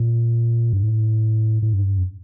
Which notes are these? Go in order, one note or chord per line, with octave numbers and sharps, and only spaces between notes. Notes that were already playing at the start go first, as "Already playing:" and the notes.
Already playing: A#2
G2
A2
A2
G2
F#2